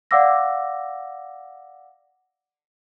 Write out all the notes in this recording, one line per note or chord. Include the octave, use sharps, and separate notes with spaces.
D5 F5 F#5 D6 E6 A#6